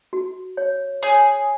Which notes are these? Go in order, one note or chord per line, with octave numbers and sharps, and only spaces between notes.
F#4
C#5
G#4 C#5